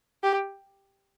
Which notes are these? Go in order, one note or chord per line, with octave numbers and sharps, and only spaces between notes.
G4